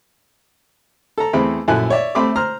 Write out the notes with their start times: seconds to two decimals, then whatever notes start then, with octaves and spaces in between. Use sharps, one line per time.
1.18 A4 A#5
1.33 E2 A3 C4 G#4 B5
1.68 A#1 F#2 E4 A4 G#5 F#6
1.90 C#5 D5 E5
2.15 A3 C4 B5 C6 D6
2.36 C5 A#5 F6